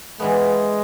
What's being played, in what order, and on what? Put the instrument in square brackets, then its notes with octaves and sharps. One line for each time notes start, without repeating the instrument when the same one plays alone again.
[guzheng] E3 G3 B3 [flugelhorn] G#3